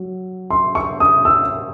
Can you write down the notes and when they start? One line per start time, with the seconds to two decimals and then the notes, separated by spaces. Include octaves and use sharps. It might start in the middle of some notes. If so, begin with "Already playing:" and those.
Already playing: F#3
0.50 C6
0.75 C#6
1.00 D#6
1.25 E6